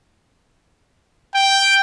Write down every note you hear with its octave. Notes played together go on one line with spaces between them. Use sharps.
G5